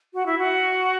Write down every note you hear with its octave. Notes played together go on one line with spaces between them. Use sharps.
F#4
E4
F#4